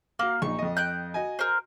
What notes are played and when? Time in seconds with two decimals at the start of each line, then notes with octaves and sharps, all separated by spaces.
0.19 A#3 F#4 F5
0.42 A#1 D#4 C#6
0.59 F2 D#5
0.77 G5 F#6 G6
1.14 F#4 D#5 G#5
1.39 A#4 C5